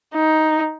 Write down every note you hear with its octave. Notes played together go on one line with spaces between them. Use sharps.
D#4